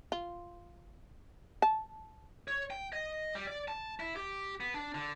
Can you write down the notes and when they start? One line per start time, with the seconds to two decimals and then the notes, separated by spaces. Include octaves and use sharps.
0.12 F4
1.62 A5
2.48 C#5
2.71 G5
2.93 D#5
3.35 G3
3.47 D5
3.68 A5
4.00 E4
4.16 G4
4.60 B3
4.74 D4
4.95 D3